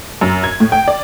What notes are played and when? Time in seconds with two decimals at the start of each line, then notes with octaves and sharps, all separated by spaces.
0.21 F#2
0.44 G#6
0.60 A2
0.72 G5
0.88 D5